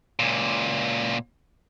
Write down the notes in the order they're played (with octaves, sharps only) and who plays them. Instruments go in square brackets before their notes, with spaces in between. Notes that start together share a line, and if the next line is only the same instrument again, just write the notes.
[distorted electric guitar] C#2 A#2